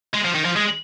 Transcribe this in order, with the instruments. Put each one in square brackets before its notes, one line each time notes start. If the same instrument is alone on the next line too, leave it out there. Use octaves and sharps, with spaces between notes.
[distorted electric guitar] G#3
F3
D#3
F3
G#3